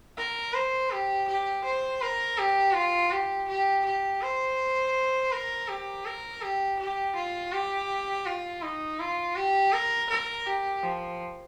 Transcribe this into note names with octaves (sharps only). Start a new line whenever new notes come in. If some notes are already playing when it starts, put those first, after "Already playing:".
A#4
C5
G4
G4
C5
A#4
G4
F4
G4
G4
G4
C5
A#4
G4
A#4
G4
G4
F4
G4
F4
D#4
F4
G4
A#4
A#4
G4
F3